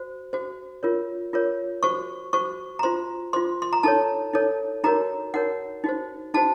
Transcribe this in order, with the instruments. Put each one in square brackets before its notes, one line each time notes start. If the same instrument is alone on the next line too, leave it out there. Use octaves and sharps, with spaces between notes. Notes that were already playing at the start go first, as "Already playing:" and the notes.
Already playing: [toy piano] F#4 C5
F#4 C5
F4 A#4 C#5
F4 A#4 C#5
F#4 C5 C#6
F#4 C5 C#6
A#5
F4 C5 C6
F4 C5 C6
C6
A#5
D#4 A4 C#5 A5
D#4 A4 C#5
D#4 F#4 A#4 C#5 A#5
D#4 F#4 A#4 C#5 F#5
D#4 F#4 C5
D#4 F#4 C5 A5